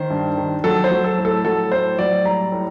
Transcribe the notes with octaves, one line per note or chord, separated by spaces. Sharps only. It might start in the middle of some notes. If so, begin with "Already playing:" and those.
Already playing: D#3 C5
G2
D#3
F#3 A4
C5
F#3
A4
A2
A4
F#3 A4
A2 C5
F#3 D5
G3 A#5
A2